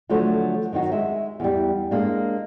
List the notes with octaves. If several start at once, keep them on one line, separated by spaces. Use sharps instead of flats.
D3 F3 F#3 A3
D#3 F#3 D#4 F#4
G#3 E5
E2 G3
G#3 A#3 D4